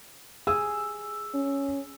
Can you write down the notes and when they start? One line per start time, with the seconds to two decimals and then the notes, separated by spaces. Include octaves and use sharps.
0.47 G#4 E6
1.34 C#4